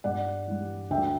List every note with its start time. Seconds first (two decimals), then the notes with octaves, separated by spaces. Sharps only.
0.04 G2 D5 F#5
0.47 E3 G3
0.90 D2 E5 G5